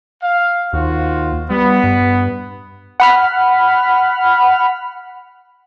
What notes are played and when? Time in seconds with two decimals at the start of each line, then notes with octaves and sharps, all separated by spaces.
0.23 F5
0.73 D#2 F4 F#4 C5
1.50 G3 B3
1.84 G2
3.00 F#5 B5 F6